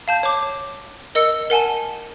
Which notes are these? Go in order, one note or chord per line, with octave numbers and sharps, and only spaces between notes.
F5 A5 G6
C#5 D6
A#4 D#5 E6 C#7
A#4 F#5 G#5 A5